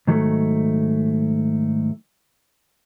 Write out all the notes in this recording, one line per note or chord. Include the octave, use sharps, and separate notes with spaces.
G#2 D#3 F#3 G3 A3